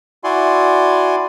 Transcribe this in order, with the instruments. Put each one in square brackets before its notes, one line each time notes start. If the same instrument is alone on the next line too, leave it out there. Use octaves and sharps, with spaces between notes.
[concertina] E4 F#4 D5 G#5 C6